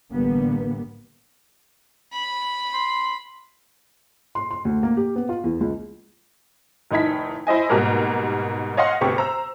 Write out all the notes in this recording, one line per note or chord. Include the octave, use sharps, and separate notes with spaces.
A1 D3 G3 A#3 B3
B5
C6
C6
C6
D2
A#3
G4
B3
F4
E2
C#2
F1 D#3 D#4 E4 G#6 B6
E4 C5 D#5 G#5
G#2 B2 G3 A#3 A#4 G#6
C#5 D#5 F5 F#5 C6
D2 C3 B3 G4 C#6
C5 A#5 E6